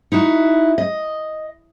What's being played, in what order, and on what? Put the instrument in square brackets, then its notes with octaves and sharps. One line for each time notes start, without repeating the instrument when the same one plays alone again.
[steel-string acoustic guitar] D#4 E4 F#4
D#5